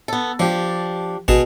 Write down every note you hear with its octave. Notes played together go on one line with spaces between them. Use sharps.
B3 A4
F3 D4 G4
A1 B2 G#4 A5